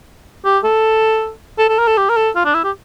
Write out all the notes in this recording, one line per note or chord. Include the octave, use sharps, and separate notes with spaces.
G4
A4
A4
A4
A#4
A4
G4
A#4
A4
F4
D4
E4
G4